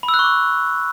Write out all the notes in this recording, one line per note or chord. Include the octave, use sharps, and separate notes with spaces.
B5
E6
F#6
C#6
D6